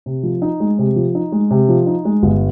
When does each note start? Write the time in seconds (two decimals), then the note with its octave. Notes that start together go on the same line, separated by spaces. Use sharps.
0.06 C3
0.23 F3
0.42 D#4
0.60 G#3
0.79 C3
0.96 F3
1.15 D#4
1.32 G#3
1.51 C3
1.69 F3
1.87 D#4
2.05 G#3
2.23 G1